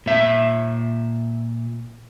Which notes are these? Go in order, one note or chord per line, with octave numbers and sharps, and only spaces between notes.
A#2 E5